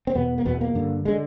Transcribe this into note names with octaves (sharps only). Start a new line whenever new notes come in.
C4
E2 B2 B3
A#3
E2 B2 B3
A#3
G2 D3
D3 G#3